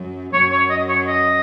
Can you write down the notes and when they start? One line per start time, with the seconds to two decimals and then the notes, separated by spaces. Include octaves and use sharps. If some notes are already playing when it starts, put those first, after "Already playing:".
Already playing: F#2
0.33 F#2 C#5
0.52 C#5
0.70 D#5
0.89 C#5
1.07 D#5